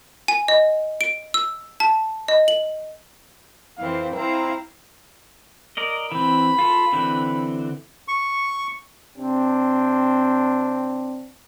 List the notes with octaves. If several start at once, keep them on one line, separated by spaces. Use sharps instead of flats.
G#5
D#5
D7
E6
A5
D#5
F#7
F2 E3 C4 F5
C4 E4 F5 A#5
A#4 D5 D#5
E3 C4 B5
F4 A4
D3 E3 C4
C#6
C3 C4 D4